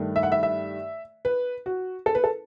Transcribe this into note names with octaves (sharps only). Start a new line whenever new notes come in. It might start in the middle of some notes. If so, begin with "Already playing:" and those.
Already playing: G2 D#3 A3
E5
F#5
E5
E5
B4
F#4
A4
B4
A4